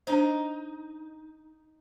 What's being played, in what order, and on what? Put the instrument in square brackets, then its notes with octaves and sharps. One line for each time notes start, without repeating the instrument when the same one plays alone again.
[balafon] D4 C5 [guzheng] D#4